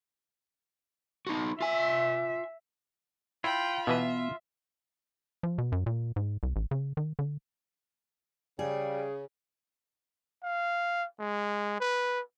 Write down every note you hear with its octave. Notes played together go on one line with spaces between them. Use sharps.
D#4 F#4
F4 E5 G#5
E4 F4 G5 B5
B2 E3 B3 B4 E5
F3
B2
F#2
A#2
G#2
C2
A1
C#3
D#3
D3
C#3 G3 G#4
F5
G#3
B4